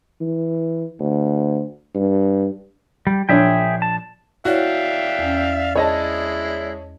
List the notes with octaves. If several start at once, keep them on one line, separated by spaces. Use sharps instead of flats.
E3
D2
G2
G3
A#1 D4 G#4 C#5 E5 G5
A5
E4 F#4 C#5 D5 E5 F5 G5
E2 C#4
G#3 E4 C#5 D#5 A5